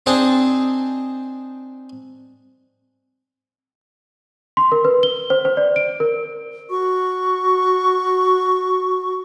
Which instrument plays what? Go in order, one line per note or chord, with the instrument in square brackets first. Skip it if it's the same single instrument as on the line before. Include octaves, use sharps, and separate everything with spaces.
[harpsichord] C4 D4 D#4 G#4 G5 A5
[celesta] C6
A#4
B4
G7
C5
C5
D5
D7
A#4
[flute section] F#4 C#6